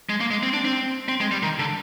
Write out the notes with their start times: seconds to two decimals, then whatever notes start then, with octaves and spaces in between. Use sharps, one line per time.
0.09 G#3
0.20 A#3
0.31 G#3
0.43 C4
0.54 D4
0.65 C4
1.08 C4
1.21 G#3
1.31 G3
1.43 D#3
1.59 D3